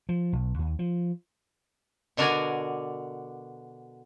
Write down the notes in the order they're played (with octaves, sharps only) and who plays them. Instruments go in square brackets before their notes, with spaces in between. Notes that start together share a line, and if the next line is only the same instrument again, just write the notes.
[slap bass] F3
B1
D#2
F3
[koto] B2 D3 F#4 A#4 D5 G#5